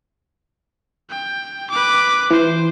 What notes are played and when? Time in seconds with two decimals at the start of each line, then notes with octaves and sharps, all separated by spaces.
1.10 G5
1.70 B4 D6
2.31 E3 C5